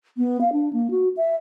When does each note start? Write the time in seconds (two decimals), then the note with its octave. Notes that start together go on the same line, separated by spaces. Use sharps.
0.17 B3
0.41 F5
0.53 D4
0.73 A#3
0.91 F#4
1.17 E5